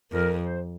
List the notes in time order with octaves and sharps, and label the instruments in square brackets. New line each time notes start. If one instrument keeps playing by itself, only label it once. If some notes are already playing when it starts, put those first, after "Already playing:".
[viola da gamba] F2 [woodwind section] A#4
[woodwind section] C5